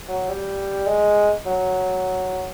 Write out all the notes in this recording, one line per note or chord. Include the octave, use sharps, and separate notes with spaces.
F#3
G3
G#3
F#3